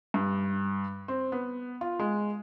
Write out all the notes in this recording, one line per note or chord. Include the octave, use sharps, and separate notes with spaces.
G2
C4
B3
F4
G#3